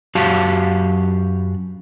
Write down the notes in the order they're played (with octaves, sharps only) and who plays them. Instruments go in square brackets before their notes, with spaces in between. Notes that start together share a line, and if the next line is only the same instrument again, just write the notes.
[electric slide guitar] F#2 F#4 G4 F5 A5